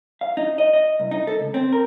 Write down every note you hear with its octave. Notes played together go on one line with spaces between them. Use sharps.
F5
D#4
D#5
D#5
C2
D#4
A4
C#2
C4
A#4